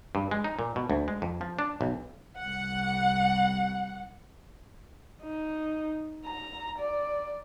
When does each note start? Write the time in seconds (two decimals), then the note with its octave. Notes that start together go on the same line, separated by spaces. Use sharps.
0.15 G2
0.31 G#3
0.44 D#4
0.59 A#2
0.76 B2
0.90 D2
1.08 G#3
1.22 F2
1.41 F3
1.59 D4
1.81 B1
2.38 C2 F#5
5.23 D#4
6.26 A#5
6.78 D5